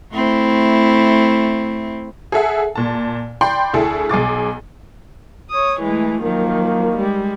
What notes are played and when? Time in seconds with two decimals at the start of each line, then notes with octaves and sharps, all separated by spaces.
0.12 A3 C4 E4
2.32 G#4 A4 E5 F#5
2.75 A#2 A5
3.41 D5 G5 B5 C6
3.74 D2 E4 G#4 A4
4.09 B1 G#4 D6 A6
5.50 C#5 D#6
5.80 E3 G#3 A3
6.22 D#3 F3 F#3 A#3
6.95 G3 G#3